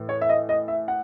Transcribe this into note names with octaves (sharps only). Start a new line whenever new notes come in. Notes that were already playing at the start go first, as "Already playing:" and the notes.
Already playing: A2 E3
C#5
E5
D#5
D#5
E5
F#5